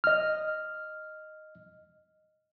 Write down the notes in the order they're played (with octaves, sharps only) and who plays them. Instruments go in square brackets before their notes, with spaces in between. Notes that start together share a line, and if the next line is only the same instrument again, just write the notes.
[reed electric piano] D#5 F6